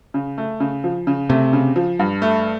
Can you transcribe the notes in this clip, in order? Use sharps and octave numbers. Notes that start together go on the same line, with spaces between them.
C#3
A3
C#3
F3
C#3
C3 A3
C#3
F3
G2
A3